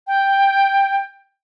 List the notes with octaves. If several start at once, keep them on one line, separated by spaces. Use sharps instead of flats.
G5